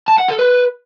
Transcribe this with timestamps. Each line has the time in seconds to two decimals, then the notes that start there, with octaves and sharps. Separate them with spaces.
0.08 A5
0.18 F#5
0.29 A4
0.39 B4